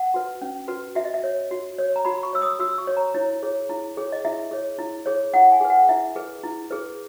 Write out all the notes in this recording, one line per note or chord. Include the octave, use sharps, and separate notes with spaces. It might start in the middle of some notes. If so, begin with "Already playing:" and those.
Already playing: F#5
F#4 B4
C#4
F#4 B4
F#4 E5
D#5
E5
C#5
F#4
C#5
A#5
F#4 B5
C#6
C#5 E6
D#6
F#4 E6
C#6
C#5
A#5
E4 C#5
G#4 C#5
E4
G#4 C#5
D#5
E4 E5
G#4 C#5
E4
G#4 C#5
E4 F#5
G#5
G#4 B4
F#5
E4 E5
G#4 B4
E4
G#4 B4